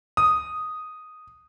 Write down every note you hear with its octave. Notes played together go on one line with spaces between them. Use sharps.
D#6